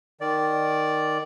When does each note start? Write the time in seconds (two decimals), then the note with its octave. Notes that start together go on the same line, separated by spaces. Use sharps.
0.21 D#3 D5